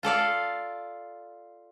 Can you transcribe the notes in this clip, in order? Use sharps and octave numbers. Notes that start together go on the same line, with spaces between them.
F4 A4 D5 F5